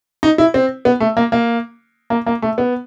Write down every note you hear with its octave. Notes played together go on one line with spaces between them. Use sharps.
D#4
E4
C4
B3
A3
A#3
A#3
A#3
A#3
A3
B3